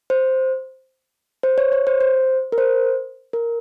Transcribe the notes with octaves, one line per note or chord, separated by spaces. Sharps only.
C5
C5
C#5
C#5
C5
C5
A#4
C5
A#4